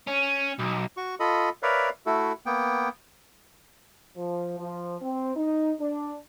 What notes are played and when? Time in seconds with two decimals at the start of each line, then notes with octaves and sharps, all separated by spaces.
0.07 C#4
0.59 B1
0.97 F#4 C#6
1.20 F4 A4 D#5 B5
1.63 A#4 B4 C#5 D5 E5 F5
2.06 A3 E4 F#4 A4
2.46 A#3 B3 G5
4.17 F3
4.59 F3
5.02 C4
5.36 D#4
5.80 D4